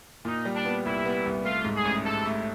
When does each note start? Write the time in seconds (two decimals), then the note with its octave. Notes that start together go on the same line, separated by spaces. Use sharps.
0.25 A#2 D#4
0.45 G3
0.55 D4
0.65 B3
0.85 C2 E4
1.05 B3
1.26 C2
1.45 A3 F4
1.65 G#2
1.76 G#4
1.85 A1
2.05 G#2 A4
2.25 A3